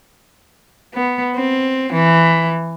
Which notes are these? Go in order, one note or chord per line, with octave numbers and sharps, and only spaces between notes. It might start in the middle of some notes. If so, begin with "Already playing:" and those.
B3
C4
E3